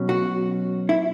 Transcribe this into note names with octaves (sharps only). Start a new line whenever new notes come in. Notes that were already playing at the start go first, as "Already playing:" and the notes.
Already playing: B2 F#3 C#4
F#4
E4